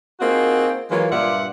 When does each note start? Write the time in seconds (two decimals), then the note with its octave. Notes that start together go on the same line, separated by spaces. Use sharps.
0.20 A#3 C4 D#4 F4 F#4 G#4
0.90 E3 F#3 G#3 A#3 F4
1.11 G2 A#2 F4 D5 E5 F#5